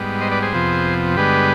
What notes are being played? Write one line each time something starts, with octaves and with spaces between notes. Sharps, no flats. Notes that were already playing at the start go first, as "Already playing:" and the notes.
Already playing: G#2 G3 B3
C5 D#5
B4 D5
G#4 C5
F2 C3 F3 B3
G2 D3 G#3 B3 G4 B4